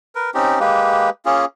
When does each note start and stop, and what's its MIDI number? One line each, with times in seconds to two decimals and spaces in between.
0.15 0.30 70
0.15 0.30 71
0.34 0.59 60
0.34 0.59 61
0.34 0.59 63
0.34 0.59 67
0.60 1.10 56
0.60 1.10 58
0.60 1.10 67
0.60 1.10 71
1.26 1.45 58
1.26 1.45 61
1.26 1.45 65
1.26 1.45 68